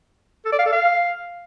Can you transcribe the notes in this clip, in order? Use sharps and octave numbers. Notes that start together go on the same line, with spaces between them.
A4
D5
F5
A4
F5